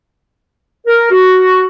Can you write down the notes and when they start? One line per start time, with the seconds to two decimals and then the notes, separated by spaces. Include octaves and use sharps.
0.87 A#4
1.10 F#4